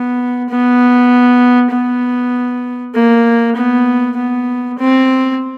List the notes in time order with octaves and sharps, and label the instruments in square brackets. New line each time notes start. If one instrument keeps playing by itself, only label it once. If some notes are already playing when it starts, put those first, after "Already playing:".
Already playing: [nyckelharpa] B3
B3
B3
A#3
B3
B3
C4